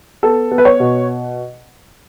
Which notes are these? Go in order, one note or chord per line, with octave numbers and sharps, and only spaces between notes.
B3 A4
B3
B4
C#5
B2